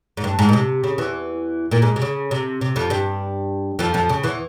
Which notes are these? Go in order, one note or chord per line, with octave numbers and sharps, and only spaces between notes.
G#2
G2
G#2
A#2
C3
C#3
E2 E3
A#2 A#3
G#2 G#3
C3
C#3
C3
C3
F2 F3
G2 G3
F2 F3
F2 F3
C#3
E2 E3